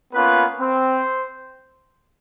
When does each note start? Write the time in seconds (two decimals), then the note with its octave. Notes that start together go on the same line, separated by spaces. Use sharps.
0.13 A#3 B3 C#4 F4 B4
0.59 C4 C5